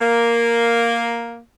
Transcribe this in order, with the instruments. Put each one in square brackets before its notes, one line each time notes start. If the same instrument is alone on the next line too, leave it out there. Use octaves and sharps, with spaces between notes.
[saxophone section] A#3